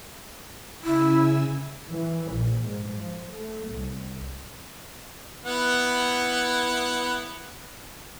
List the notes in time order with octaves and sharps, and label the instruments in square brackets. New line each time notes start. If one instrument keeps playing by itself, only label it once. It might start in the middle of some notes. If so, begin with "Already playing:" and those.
[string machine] C#3 G#5 E6 [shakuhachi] E4
[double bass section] E3
A#1
G#2
F3
A3
C2
[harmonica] B3 E4 F#5